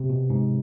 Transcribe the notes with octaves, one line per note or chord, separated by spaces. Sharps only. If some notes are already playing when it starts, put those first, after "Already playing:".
Already playing: C3
B2
G#2